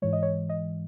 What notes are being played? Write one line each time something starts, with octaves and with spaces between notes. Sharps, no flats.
G#2 E3 G#3 C#5
D#5
C#5
D#5